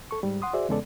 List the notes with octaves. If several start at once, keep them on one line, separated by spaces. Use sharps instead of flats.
A4 C#6
G#2 G3
F#5 C6 D#6
F#4 G#4 C5 D5 E5
E2 C#3 G#3 B3 A4 D5